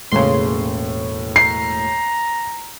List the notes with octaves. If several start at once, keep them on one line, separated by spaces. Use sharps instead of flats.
E1 A2 C#3 A#3 C6
A#5 C7